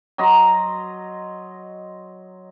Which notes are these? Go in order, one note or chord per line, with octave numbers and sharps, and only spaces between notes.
F#3 D#5 A#5 C6